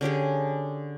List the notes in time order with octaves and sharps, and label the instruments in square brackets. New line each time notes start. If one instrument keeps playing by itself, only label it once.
[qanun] D3 C#4 G4 G#4